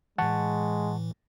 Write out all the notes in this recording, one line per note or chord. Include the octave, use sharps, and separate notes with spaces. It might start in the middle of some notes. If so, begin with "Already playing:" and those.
A2 E3 G#3 F#5 A5 C#6